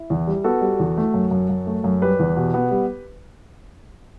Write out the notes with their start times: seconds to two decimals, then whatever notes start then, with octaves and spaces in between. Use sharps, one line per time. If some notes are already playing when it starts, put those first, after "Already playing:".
Already playing: E4
0.10 E2
0.28 G3
0.44 B3 F#4 A4
0.61 G3
0.79 E2
0.97 A3
1.14 F#2
1.31 F#2
1.49 F#2
1.67 A3
1.84 F#2
2.02 G3 G4 B4
2.19 E2
2.37 B2
2.54 B3
2.71 G3